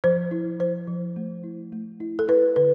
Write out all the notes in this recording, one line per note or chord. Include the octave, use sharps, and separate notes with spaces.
F3 C5
E4
F3 C5
F3
A3
E4
A3
E4
A4
E4 B4
D3 B4